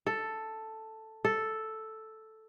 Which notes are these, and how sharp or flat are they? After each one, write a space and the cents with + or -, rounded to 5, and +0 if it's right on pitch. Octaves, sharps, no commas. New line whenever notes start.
A4 +5
A4 +0